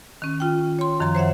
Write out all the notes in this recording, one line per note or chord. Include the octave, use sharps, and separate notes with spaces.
D#3 C#4
F4 G5
C#5 C6
F#2 D#3 F3 A#5 C6
C5 C#5 E5 F#5